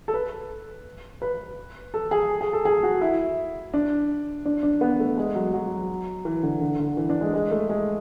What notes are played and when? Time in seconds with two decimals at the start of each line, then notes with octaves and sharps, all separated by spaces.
0.08 A4
0.14 B4
1.22 B4
1.94 A4
2.11 G#4
2.41 G#4
2.53 A4
2.65 G#4
2.83 F#4
3.01 E4
3.74 D4
4.45 D4
4.63 D4
4.81 B3
5.00 A3
5.17 G#3
5.35 F#3
5.54 F#3
6.25 E3
6.43 D3
6.61 D3
6.80 D3
6.97 E3
7.10 D4
7.21 G#3
7.33 G#3
7.51 A3
7.69 G#3